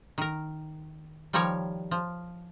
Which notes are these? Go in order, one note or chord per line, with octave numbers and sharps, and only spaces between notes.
D#3 A#4
D#3 F3 G3 A#4 C#5
F3